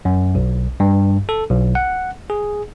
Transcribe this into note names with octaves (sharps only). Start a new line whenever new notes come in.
F#2
B1
G2
A4
B1
F#5
G#4